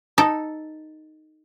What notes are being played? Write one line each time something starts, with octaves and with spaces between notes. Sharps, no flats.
D#4 A4